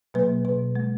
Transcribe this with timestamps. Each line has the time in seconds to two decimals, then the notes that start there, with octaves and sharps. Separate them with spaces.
0.14 B2 F#3 A#3 B4
0.45 B2 B4
0.76 G#3